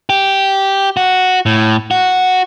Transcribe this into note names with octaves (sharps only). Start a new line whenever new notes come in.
G4
F#4
A2
F#4